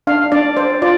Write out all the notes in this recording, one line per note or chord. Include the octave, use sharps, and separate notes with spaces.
D4 F5
D4 D5
C5 D5
F4 D5